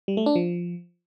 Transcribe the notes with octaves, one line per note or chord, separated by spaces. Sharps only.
G3
A3
D4
F3